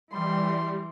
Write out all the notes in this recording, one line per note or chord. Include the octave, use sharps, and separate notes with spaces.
E3 G3 C6